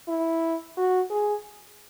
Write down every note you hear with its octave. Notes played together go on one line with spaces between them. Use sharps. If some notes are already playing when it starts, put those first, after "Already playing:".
E4
F#4
G#4